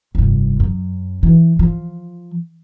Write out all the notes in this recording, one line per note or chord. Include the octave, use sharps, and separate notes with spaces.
F1 G2
F#2
E3
F3